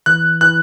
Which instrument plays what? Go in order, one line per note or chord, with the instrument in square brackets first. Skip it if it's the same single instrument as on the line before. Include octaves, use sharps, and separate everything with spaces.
[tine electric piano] E3 [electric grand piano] F#6
[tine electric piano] E3 [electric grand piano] F#6